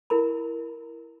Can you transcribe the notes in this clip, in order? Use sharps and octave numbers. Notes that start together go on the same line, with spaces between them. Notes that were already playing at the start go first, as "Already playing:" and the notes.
E4 A#4 B5